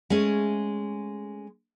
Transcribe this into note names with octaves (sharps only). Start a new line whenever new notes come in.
G#3 A3 C#4